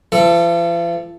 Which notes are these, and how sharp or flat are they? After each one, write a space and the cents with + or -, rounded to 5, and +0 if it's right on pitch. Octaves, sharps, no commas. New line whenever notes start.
F3 -45 A4 +0